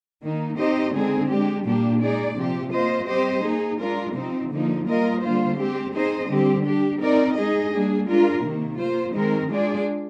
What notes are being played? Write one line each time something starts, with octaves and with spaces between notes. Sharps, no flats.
D#3 A#3 D#4
C4 D#4 G4 C5 D#5
D3 G#3 C4 D#4 G#4
G#3 D4 G4
A#2 G3 A#3 D4 G4
G#3 D#4 G#4 D5
C3 F3 C4 G4
A#3 F4 C5 D#5
G3 C4 G4 C5 D#5
A#3 D#4 G#4
G#3 D4 F4 A#4
C3 F3 C4 D#4
D3 F3 A#3 D#4
G3 A#3 F4 A#4 D#5
D3 G3 A#3 F4 C5
G#3 C4 G4
C4 D#4 G#4 C5 D#5
D3 G3 C4 G4
G3 D4 G4
C4 D#4 A#4 D5
G#3 D#4 G#4 D#5
G3 A#3 D4 G#4
G#3 D4 F4 A#4
C3 D#3 A#3
A#3 F4 C5
D#3 G#3 C4 D#4 A#4
G#3 D4 F4 G#4 D5